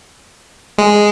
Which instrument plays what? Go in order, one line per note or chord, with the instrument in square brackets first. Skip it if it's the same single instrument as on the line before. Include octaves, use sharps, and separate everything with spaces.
[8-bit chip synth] G#3